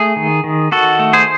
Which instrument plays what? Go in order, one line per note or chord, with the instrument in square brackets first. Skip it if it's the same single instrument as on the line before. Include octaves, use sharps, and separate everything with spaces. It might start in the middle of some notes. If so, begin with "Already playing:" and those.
Already playing: [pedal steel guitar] A3 G#4
D#3
D#3
D#3 F#4 A4
A3
G#4 C5